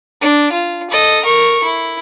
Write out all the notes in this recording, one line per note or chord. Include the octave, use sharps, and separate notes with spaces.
D4
F4
A4 D#5
A#4 C#6
E4